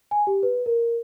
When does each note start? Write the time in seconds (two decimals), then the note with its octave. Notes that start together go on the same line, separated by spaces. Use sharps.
0.11 G#5
0.27 G4
0.43 B4
0.66 A#4